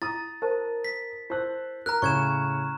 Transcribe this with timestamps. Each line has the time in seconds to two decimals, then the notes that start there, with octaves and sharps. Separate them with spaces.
0.02 E4 A#5 D#6 A6
0.42 A#4 C5 A5
0.85 B6
1.30 E4 C5 A5 E6 F#6
1.86 A#4 A#5 F6 F#6
2.02 A2 C#3 C#5 C#6 G#6 E7